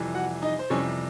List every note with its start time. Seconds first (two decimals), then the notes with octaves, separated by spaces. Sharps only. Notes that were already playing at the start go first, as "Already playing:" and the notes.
Already playing: F2 C3 E3 G3
0.15 F#4 F#5
0.42 D#4 D#5
0.59 C5
0.70 F2 C3 E3 G3 C#4 C#5